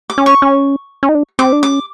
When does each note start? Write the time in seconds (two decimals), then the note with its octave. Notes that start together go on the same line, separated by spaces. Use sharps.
0.10 D6
0.18 C#4
0.26 C#6
0.42 C#4
1.03 C#4
1.09 D#4
1.15 D4
1.39 C4 D6
1.53 D4
1.63 C#4 D6